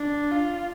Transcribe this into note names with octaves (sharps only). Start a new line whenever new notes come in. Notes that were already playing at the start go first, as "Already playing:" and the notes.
Already playing: D4
F4